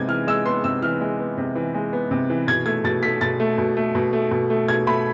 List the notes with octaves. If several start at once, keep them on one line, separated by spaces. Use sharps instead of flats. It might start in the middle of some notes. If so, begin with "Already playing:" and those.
Already playing: C3 G#3 B3 G#6
E3 F6
G#3 E6
B3 C6
C3 E6
E3 F6
G#3
B3
C3
E3
G#3
B3
C3
E3
B2 G#6
A3 G#6
B2 A6
A3 B6
B2 A6
A3
B2
A3
B2
A3
B2
A3
B2 G#6
A3 B5